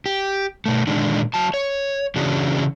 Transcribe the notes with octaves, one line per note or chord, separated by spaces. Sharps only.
G4
B2 A3
A#2 D3 D#3 G#3 D4 D#4
F#3 A5
C#5
C#3 E3 C#4 D4 F#4 G#4